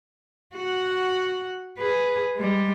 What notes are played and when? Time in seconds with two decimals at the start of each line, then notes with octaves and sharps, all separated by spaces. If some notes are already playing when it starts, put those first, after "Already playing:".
0.56 F#4 F#5
1.78 G#4 B4
2.37 G3 G#3